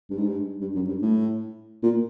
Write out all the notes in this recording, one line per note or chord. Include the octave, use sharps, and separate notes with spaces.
G2
G#2
G2
G2
F#2
G2
A2
A#2